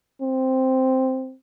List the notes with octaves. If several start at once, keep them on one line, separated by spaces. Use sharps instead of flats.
C4